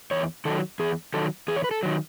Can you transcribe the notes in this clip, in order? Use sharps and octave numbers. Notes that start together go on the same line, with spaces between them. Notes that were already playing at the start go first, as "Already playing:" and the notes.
E2 C#5
D#3 F#3 A4
E2 G#4
D#3 F#3 A4
E2 G#4
C#5
B4
A4
D#3 F#3